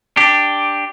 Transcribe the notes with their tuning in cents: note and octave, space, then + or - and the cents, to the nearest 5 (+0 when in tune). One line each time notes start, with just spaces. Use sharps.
D4 +0 G4 +5